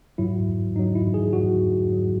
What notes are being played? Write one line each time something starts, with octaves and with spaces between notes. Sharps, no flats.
G#2 F#3 E4
G#2 F#3 D#4
E4
G#4
G#2 F#3 F#4
G#2 F#3